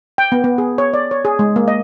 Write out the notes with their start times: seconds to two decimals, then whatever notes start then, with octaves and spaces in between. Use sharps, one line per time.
0.18 G5
0.32 B3
0.44 B3
0.58 G#4
0.78 C#5
0.94 D5
1.11 C#5
1.25 G#4
1.39 G#3
1.56 A#3
1.68 D#5